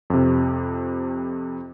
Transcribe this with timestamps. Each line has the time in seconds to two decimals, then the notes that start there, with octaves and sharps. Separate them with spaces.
0.10 F2 C3